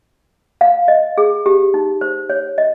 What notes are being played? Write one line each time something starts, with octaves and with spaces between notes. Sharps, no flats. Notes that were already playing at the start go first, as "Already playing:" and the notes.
F5
D#5
G#4
G4
D#4
C5
C#5
D#5